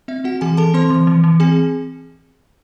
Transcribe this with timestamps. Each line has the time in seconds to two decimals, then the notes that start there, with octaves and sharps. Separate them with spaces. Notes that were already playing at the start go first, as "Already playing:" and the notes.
0.08 C4 E5
0.24 C4 F#4 F#5
0.41 E3 G#4 G#5
0.57 E3 A4 A5
0.74 C4 C5 C6
0.90 E3
1.07 E3
1.24 E3
1.40 C4 G#4 G#5